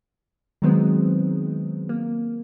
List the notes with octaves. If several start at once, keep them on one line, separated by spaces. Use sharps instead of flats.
D#3 F#3 G#3 B3 C4
A#3